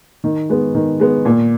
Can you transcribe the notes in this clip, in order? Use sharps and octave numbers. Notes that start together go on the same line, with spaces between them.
D#3
G#3 B3
D#3
G#3 B3
A#2